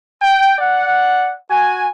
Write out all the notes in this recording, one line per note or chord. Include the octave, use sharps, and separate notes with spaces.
G5
D5 F#5
F#4 G#5